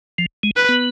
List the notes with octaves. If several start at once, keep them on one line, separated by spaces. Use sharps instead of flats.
F3
G#3
B4
B3